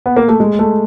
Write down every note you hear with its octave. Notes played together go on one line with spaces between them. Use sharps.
B3
A#3
A3
G#3
A3